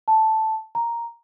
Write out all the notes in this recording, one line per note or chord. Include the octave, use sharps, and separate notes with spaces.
A5
A#5